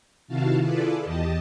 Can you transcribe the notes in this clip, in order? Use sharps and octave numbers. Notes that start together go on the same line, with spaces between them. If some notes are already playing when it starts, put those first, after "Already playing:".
C3 D#3 E4 F#4 F5 A5
E4 F4 G#4 A4 B4 D5
E2 G4 D#5 A5